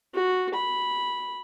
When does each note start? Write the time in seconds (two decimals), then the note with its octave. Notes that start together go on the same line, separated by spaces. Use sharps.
0.14 F#4
0.55 B5